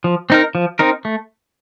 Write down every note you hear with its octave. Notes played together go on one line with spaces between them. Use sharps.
F3
C4 D#4 A#4
F3
C4 D#4 A#4
A3